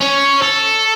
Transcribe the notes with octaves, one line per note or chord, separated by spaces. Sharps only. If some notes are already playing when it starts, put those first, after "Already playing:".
C#4 C#5
A4